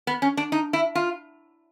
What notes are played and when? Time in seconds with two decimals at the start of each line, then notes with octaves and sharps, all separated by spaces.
0.07 B3
0.22 C#4
0.37 D4
0.52 D#4
0.73 E4
0.95 F4